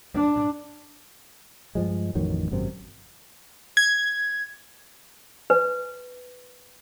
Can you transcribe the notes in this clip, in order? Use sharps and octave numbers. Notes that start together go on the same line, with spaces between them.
D4
G2 F3 G#3
A1 F2 D#3 F#3
G#1 F#2 C3 C4
G#6
B4